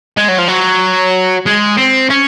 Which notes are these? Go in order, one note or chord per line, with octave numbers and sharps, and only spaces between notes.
G#3
F#3
F3
F#3
G#3
C4
C#4